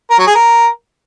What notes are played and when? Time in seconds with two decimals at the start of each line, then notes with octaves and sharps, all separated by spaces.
0.10 A#4
0.18 F#3
0.27 G#4
0.35 A#4